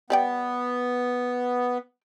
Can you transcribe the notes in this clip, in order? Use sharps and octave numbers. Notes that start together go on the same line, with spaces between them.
G3 B3 D5 G5